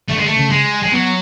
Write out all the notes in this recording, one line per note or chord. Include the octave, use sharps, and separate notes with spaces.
D3 A3
G#3
A3
C#3
G#3
G#3
F#3 B3